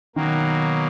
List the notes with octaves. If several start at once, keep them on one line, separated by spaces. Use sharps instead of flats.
B2 D#3 F#3 A#3